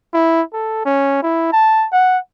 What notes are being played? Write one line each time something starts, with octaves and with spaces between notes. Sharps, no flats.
E4
A4
C#4
E4
A5
F#5